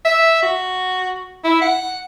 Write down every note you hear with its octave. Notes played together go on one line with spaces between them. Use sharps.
E5
F#4
E4
F#5